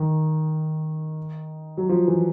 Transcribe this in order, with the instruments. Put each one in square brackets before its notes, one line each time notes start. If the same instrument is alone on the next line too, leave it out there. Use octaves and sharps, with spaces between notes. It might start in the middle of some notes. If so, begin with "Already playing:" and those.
Already playing: [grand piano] D#3
F#3
F3
E3